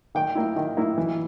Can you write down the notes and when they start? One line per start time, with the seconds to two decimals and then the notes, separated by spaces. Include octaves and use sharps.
0.15 D#3 G5
0.35 A#3 E4
0.56 D#3
0.77 A#3 E4
0.98 E3